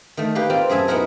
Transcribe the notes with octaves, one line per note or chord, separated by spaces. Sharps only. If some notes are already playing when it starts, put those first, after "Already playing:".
D#3 A3
A#3 G4 B4
C4 F4 D5
F#2 G#4 E5 G#5 A5
B3 D#4 E4 F#4 A#4